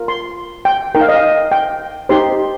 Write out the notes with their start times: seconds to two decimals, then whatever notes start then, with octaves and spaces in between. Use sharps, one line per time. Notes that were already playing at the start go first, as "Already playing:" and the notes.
Already playing: F4 A#4
0.08 C6
0.65 G5
0.95 D#4 A#4 G5
1.01 F5
1.09 D#5
1.16 F5
1.52 G5
2.09 D#4 G4 C5 C6